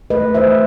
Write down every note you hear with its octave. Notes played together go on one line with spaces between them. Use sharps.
A3 B4 D#5
E3 C5 E5